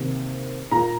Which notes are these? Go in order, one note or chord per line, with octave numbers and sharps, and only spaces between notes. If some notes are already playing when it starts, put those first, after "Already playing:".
Already playing: C3 D#3 A#3
A#2 A#3 A#5